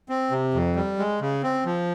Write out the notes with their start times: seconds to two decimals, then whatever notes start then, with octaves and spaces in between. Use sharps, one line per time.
0.09 C4
0.31 C3
0.54 F2
0.76 G3
0.99 G#3
1.21 C#3
1.43 C4
1.65 F3